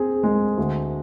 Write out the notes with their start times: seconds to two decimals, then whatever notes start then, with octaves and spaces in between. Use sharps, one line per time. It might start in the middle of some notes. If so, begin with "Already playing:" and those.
Already playing: C4 G#4
0.23 G#3
0.57 D2